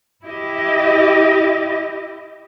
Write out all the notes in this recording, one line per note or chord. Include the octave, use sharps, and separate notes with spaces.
E4 G4 D#5